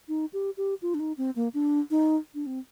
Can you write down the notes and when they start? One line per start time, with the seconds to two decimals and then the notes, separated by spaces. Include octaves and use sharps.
0.08 D#4
0.33 G4
0.57 G4
0.82 F4
0.94 D4
1.00 D#4
1.18 C4
1.36 A#3
1.54 D4
1.91 D#4
2.35 D4
2.46 C4